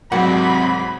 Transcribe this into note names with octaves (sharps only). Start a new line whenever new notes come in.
C2 G#2 C3 F#3 G#3 F#5 B5